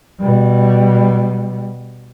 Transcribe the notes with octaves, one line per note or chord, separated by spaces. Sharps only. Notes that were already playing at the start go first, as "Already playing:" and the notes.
B2 G3